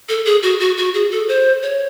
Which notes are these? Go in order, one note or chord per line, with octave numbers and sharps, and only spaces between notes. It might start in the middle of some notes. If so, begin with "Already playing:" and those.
A4
G#4
F#4
F#4
F#4
G#4
A4
C5
C#5